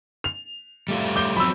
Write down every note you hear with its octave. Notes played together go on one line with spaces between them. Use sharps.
F7
G3 A3 F4
D6 G6 G7
F3 F#3 C4 B5 E6